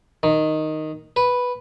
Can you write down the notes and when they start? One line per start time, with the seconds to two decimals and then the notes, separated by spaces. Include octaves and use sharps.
0.23 D#3
1.16 B4